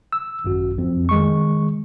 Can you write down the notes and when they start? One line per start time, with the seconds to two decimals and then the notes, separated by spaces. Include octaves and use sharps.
0.12 E6
0.44 G#1 F#2 F#4
0.75 B1 F2
1.09 D#3 G#3 C#6